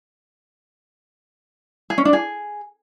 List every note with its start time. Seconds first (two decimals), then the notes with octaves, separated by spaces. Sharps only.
1.90 G#4
1.98 C#4
2.05 D4
2.13 G#4